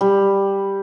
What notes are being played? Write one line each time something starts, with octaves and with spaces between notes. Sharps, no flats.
G3